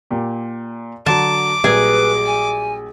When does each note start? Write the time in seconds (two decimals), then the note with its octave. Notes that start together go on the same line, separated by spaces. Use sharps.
0.11 A#2 G4
1.06 D3 F#3 A5 D6
1.64 A#1 F#3 G3 G#4 B4
2.26 G#5